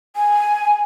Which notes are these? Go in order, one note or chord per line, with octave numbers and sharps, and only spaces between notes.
G#5